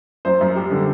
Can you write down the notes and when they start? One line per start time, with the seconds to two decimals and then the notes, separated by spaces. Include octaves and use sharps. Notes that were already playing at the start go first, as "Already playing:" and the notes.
0.25 F#2 C5
0.41 F#2
0.56 G3
0.71 D3